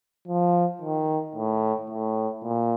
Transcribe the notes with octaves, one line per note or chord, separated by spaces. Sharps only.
F3
D#3
A2
A2
A#2